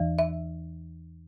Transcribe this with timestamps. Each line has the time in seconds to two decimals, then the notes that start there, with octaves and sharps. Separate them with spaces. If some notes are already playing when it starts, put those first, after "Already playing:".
Already playing: E2 E3
0.19 E5